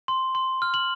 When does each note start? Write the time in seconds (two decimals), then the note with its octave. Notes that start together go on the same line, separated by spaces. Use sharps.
0.08 C6
0.35 C6
0.62 F6
0.74 F#7